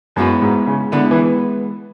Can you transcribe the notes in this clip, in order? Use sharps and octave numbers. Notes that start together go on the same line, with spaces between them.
F#2 G#3 B3 E4 B4
G#2
C#3
D3 G#3 B3 E4 B4
E3